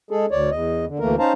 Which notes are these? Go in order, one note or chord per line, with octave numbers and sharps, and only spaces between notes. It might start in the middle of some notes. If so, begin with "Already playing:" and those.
G#3 G#4 A4
D2 C#5 D5
E2 D#5
D3
D2 E3 A3 A#3 A#4
C#4 D#4 C5 F5 A5 A#5